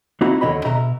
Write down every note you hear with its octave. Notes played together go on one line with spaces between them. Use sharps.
A#3 C4 D#4 E4 F#4
D#2 D3 F3 C#5 D#5 B5
B2 E5 A#5